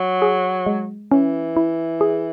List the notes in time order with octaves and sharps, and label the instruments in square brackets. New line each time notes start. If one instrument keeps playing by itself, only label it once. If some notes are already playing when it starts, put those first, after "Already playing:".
Already playing: [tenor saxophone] F#3
[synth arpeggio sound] G#4
G#3
[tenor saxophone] E3 [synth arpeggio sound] C#4
[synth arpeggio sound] E4
G#4